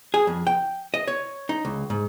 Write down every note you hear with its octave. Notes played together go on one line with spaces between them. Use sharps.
G#4
F2
G5
D#5
C#5
D#4
C#2
G#2